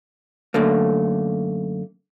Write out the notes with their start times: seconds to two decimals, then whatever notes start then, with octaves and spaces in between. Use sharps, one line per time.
0.54 F#2 D3 A3 A#3